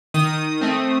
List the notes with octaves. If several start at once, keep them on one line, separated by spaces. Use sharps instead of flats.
D#3 D#6
A3 C4